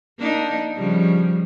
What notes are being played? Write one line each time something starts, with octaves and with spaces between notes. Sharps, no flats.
A#3 D4 D#4
C#3 F3 G3